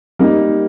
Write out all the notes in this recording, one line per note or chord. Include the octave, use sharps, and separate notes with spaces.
G3 A#3 D#4